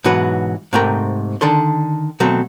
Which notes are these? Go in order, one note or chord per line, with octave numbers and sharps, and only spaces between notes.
G#2 B2 E3 F#3 F#4 B4
G#2 C3 A3 A#4 G5 A#5
D3 D#3 D4 A4 C6
B2 F#3 A3 C4